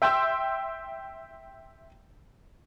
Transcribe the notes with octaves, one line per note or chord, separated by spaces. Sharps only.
E5 G5 C6 E6